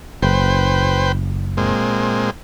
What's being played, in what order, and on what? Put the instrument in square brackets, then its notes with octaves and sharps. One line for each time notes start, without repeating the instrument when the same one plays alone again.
[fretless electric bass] F#1 [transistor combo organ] B4 C5 G5
[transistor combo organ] A#2 G#3 C4